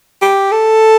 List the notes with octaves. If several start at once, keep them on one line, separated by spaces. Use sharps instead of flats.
G4
A4